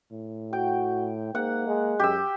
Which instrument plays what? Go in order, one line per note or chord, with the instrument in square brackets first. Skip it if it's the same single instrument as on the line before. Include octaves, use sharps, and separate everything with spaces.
[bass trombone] A2
[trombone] F#4 [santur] G5
[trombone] G#2 [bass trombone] A#3 [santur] F#5
[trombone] G#3
[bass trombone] F#2 [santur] G4 E6